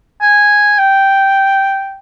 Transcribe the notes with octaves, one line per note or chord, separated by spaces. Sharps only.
G#5
G5